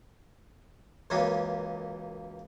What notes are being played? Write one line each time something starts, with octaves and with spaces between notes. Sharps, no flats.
C#2 F#2 C#3 E3 A#3 C#4